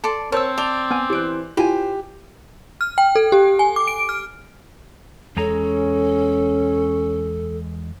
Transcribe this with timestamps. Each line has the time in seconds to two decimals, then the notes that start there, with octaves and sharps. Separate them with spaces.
0.04 A4 D5 A5 C6
0.32 C4 A#4 C5 C#5 A5 E6
0.58 D5 A5 F7 G7
0.91 B3 G#5
1.10 E3 G4 C5 F#6 D7
1.57 E4 F4 G4 C5 G#5
2.81 F6
2.98 G5
3.16 A4
3.32 G4
3.59 G#5
3.76 D6
3.87 D7
4.09 F6
5.37 E2 G#3 C#4 A4 A#5